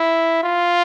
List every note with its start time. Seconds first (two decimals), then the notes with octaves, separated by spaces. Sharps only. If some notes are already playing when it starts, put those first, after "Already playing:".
Already playing: E4
0.43 F4